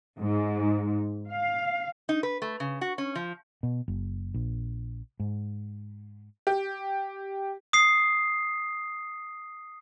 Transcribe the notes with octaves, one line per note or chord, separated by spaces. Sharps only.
G#2
F5
D#4
B4
A3
C#3
F#4
C#4
F3
B2
F#1
A#1
G#2
G4
D#6 C7